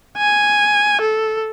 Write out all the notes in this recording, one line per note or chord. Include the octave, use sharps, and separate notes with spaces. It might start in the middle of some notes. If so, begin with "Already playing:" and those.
G#5
A4